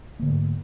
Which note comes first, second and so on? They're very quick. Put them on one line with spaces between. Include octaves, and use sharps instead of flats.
A#3 D3 A3 G#2